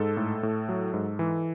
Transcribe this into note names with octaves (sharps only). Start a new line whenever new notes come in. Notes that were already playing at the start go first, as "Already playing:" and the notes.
Already playing: G#2 A4
A2
A2
F#3
G#2
E3